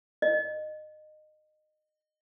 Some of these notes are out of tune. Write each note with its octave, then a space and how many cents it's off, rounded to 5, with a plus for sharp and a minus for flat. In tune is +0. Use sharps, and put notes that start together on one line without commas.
D#5 -25